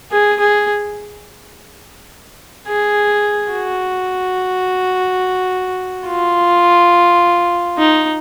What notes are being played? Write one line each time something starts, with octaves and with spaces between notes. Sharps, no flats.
G#4
G#4
G#4
F#4
F4
D#4